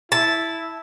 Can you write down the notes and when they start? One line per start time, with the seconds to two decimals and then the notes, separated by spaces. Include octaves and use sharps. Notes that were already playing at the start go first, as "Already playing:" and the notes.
0.12 E4 A5